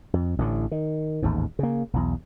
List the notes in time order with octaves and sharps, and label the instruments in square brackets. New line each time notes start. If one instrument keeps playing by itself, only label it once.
[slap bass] F2
A1 A2 D3
D#3
A1 D#2 G#2
C#3 A#3
B1 E2